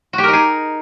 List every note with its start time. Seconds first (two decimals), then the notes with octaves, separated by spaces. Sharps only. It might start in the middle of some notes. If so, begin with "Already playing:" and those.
0.13 F#4
0.18 G4
0.23 A#4
0.28 D#4
0.33 G#4